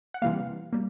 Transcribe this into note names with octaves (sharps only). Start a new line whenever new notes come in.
F#5
C3 E3 G3 A#3 F5
G3 A#3